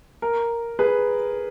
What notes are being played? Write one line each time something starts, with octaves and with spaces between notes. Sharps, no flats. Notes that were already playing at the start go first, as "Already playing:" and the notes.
A#4
G#4 B4